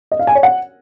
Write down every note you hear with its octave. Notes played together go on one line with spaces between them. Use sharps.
D#5
F5
G#5
C#5
F#5